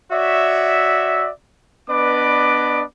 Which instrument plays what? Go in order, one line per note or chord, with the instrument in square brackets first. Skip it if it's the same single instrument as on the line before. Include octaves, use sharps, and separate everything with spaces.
[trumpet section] F#4 C#5 D5 E5
B3 D4 B4 D5 D#5 D6